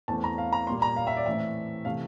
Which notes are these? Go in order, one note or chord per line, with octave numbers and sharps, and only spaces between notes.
E2 E3 A3 C4 A5
A#5
F5
A#5
A#2 G3 A#3 C6
A#5
F5
E5
D5
A2 E3 A3 C4 E5
C3 E3 A3 C4 F5